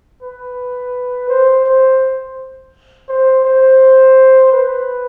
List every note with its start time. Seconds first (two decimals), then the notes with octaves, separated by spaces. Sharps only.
0.23 B4
1.29 C5
1.65 C5
3.09 C5
3.45 C5
4.52 B4